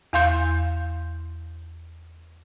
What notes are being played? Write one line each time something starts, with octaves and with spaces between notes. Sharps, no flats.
E2 F5 C6 G6